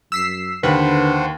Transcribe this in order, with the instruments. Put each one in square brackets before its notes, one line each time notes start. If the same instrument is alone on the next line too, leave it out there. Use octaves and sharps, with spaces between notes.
[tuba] F#2 [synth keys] E6 B6 C7
[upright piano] D#2 [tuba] D3 [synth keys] B4 [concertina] C5 F#5 A5